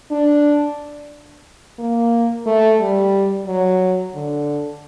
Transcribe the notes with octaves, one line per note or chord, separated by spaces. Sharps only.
D4
A#3
A3
G3
F#3
D3